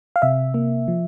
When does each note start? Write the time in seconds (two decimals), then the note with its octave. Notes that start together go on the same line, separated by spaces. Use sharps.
0.16 F5
0.22 C3 E5
0.54 A#3
0.88 F3